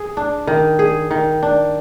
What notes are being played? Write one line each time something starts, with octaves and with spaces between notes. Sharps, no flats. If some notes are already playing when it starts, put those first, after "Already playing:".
Already playing: G#4
D4
D#3
G#4
D#3
D4